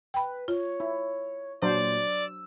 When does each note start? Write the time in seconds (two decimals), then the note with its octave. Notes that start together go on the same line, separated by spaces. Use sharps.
0.14 B4 G5 B5
0.48 F4 C#5
0.80 E4
1.63 A#2 F#3 D4 C5 D5
2.08 E6